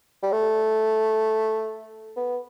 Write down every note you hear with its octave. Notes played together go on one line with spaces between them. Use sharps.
G3
A3
B3